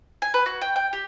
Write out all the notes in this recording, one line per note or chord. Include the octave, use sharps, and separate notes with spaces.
G#5
B4
F#4
G5
G5
G4